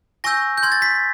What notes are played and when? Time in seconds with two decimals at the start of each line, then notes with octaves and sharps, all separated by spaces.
0.24 G#5 C#6 E6 G6 A#6
0.58 G6
0.63 C6 F6 G#6
0.72 A6
0.82 B6